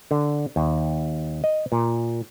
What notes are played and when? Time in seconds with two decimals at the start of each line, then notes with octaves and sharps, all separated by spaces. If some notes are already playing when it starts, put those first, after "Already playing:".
0.11 D3
0.56 D#2
1.44 D#5
1.72 A#2